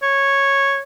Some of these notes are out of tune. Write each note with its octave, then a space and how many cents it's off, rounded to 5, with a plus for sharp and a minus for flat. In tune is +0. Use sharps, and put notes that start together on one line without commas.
C#5 -10